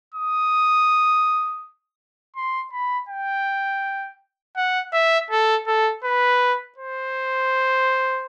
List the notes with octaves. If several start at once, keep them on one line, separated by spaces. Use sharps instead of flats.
D#6
C6
B5
G5
F#5
E5
A4
A4
B4
C5